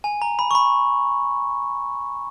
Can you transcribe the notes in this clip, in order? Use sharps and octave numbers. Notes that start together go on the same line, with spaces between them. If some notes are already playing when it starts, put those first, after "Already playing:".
G#5
A#5
B5
C#6
B5